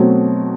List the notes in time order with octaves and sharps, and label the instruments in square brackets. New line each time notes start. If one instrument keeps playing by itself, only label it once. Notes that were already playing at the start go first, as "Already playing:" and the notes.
Already playing: [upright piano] B2 F#3 A3 C4